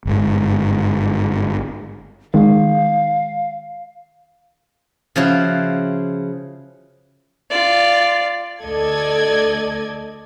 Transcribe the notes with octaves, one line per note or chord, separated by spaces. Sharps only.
G1 G#2
D#3 G#3 F5
C#3 F3 E4 F#4
F4 D5
D2 A4 D5 D#5 G#6